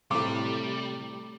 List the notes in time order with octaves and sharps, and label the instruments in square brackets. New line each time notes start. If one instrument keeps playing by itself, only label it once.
[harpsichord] A2 C3 [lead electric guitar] G3 [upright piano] D6